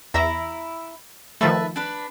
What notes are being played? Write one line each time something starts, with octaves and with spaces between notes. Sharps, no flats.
E2 E4 E5 A#5
D#3 F3 A3 B4 E5 A5
D4 B4